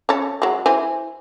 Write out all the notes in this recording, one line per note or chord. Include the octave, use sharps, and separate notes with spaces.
C#4 A4
F#3 G#3
E3 C5 G#5